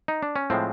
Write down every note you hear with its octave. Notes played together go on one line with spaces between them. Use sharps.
D#4
D4
C#4
A2 F3 G#3 C4